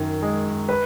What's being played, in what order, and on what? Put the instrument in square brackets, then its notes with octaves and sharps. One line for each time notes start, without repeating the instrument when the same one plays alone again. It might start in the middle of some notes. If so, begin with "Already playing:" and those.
Already playing: [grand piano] F#2 D#3
G#3
B4